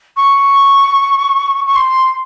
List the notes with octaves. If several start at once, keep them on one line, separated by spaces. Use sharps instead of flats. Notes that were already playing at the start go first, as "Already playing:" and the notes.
C#6
C#6
C6